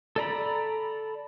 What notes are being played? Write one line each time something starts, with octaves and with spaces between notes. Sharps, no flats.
A4 D5 A#5 B5